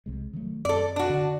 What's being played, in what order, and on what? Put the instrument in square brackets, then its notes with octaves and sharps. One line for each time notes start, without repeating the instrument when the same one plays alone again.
[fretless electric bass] C2 C3 G#3
D#3 F#3 A3
[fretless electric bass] F#2 C4 [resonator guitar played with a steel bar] A4 D5
[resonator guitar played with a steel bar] D4 F#4
[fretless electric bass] D3